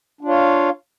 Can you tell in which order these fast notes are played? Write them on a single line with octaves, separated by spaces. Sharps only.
D4 F4 C#5 F5